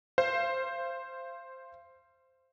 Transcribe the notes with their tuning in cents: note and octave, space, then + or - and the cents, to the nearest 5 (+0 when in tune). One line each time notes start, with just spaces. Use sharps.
C5 +0 F5 -35